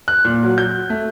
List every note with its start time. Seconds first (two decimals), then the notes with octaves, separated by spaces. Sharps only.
0.08 F#6
0.25 A#2
0.43 F#3
0.58 G6
0.90 A3